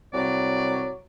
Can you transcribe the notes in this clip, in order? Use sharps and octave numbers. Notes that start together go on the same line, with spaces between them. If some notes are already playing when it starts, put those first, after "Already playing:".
C2 F#3 D5